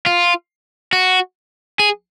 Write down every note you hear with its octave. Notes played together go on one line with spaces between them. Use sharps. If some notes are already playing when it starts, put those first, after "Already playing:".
F4
F#4
G#4